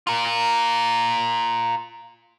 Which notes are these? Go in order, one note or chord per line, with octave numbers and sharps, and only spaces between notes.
F4 A#4